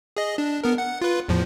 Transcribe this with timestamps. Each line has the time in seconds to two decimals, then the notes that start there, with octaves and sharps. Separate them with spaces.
0.17 G#4 D#5
0.38 D4
0.64 B3 A#4
0.78 F#5
1.01 F4 B4
1.29 E2 A2 F3